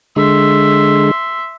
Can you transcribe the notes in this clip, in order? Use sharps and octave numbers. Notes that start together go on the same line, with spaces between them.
D3 G#3 E5 C6